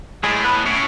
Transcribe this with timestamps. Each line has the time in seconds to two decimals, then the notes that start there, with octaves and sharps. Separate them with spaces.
0.24 A2 G#3 G#4
0.44 B3 B4
0.66 A2 C#4 C#5